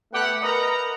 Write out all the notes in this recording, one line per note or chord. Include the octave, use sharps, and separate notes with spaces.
A3 B3 G4 F#5
A#4 B4 D#5 F#5 A#5